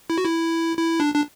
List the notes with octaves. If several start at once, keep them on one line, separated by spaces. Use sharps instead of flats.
E4
F#4
E4
E4
D4
D4